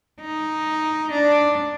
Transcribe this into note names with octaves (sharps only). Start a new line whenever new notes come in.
D#4
D4